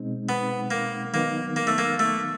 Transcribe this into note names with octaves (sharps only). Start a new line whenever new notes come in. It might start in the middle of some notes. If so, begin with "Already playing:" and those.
Already playing: B2 G#3 C4 D#4
B3
A#3
D#3 F#3 A#3 B3 D#4
A#3
A3
A#3
A3